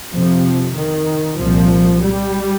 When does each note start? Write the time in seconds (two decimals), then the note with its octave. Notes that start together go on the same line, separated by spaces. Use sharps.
0.13 F2 C3 F3
0.76 D#3
1.40 C2 A#2 F3
2.04 G3